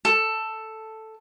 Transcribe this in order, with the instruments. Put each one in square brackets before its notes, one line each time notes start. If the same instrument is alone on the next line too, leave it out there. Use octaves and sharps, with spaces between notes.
[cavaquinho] A4